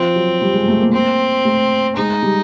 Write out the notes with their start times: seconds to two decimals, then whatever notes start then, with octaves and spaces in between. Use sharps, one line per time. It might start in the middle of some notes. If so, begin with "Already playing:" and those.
Already playing: F3 C4
0.16 F#3
0.41 G3
0.54 G#3
0.68 A3
0.80 A#3
0.93 C4
1.45 A3
1.97 G#3 D#4
2.23 G3